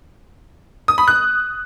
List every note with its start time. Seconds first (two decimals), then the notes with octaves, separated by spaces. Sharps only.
0.88 D#6
0.98 B5
1.08 F#6